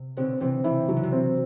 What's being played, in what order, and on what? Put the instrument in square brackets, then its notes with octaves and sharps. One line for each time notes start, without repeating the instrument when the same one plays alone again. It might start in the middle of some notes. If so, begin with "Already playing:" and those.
Already playing: [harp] C3
[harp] B2 D3 [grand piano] C4
[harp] C3 E3 [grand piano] C4
[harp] C3 E3 [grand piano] E4
[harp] C3 [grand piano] F#3
[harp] D3
C3
[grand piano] C4